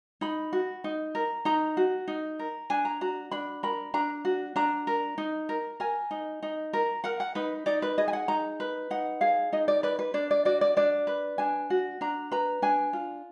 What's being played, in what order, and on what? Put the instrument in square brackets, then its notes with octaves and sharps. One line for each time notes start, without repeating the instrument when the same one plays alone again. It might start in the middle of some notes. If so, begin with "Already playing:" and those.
[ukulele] D#4 B5
F#4
D#4
A#4
D#4 A#5
F#4
D#4
A#4
D4 G#5
A#5
F#4 A#5
D4 B5
A#4 B5
D4 A#5
F#4
D4 A#5
A#4
D#4
A#4
A#4 G#5
D#4
D#4
A#4
A#4 F#5
F#5
D#4 B4
D#4 D5
B4
G#4 D#5
G#5
F#5
D#4 A#5
B4
D#4 F#5
G#4 F5
D#4 D#5
D5
B4 D5
B4
D4 D5
D5
F#4 D5
D5
D4 D5
B4
D4 G#5
F#4
D4 A#5
B4 A#5
D4 G#5
F4